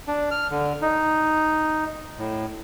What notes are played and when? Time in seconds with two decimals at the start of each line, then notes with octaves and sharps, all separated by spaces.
0.07 D4
0.31 F6
0.51 D3
0.82 D#4
2.19 A2